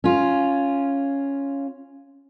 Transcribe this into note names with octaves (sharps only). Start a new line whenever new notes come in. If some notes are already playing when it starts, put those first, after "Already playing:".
C#4 F4